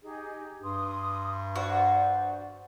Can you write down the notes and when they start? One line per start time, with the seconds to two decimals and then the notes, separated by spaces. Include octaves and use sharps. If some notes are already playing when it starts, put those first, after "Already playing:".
0.02 D#4 G4 G#4
0.62 G2 C6 D#6
1.56 F#4 C5 D5